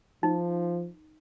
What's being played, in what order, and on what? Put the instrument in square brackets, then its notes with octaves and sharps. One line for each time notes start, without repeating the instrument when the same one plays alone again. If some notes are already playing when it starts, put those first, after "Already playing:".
[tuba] F3 [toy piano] D#4